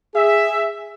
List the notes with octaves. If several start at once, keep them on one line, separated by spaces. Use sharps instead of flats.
G#4 E5